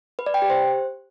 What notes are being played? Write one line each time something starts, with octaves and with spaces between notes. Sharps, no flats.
B4
D5
G5
G4
C5